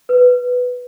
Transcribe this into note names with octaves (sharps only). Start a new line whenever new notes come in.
B4